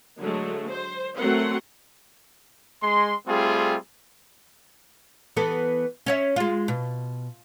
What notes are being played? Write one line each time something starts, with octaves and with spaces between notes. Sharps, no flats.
D3 F#3 G#3 A3
C5
F#3 A3 C4 A#4 F#5 C6
G#3 C6
G3 A3 C4 F4 G#4
E3 B3 A4
C#4 C#5 E5
G#3 F4
B2